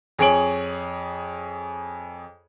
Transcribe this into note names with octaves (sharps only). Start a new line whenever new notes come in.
F2 G#4 C#5 G#5 D7 F#7